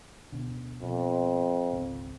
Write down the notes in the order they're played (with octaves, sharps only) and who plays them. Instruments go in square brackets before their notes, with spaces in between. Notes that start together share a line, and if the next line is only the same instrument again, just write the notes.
[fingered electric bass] D1 B2 D3
[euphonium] F2 [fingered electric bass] B2
[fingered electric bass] G#1 C#2 C4